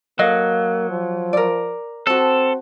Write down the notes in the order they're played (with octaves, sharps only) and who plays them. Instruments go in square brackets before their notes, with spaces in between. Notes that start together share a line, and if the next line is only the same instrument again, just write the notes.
[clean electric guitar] F#3 [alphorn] A#3 [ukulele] A4 D#5 F5
[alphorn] F3
[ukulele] A#4 D5
[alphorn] C4 [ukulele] F#4 A5 [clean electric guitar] A4